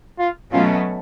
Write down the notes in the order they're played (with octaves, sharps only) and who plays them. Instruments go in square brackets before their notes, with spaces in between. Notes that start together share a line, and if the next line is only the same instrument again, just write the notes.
[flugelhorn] F4
[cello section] B2 F#3 A3 C#4 [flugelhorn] F4